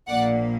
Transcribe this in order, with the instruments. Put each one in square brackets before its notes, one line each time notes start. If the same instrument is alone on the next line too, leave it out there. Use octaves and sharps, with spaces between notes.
[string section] A#1 A#2 A#3 D5 F#5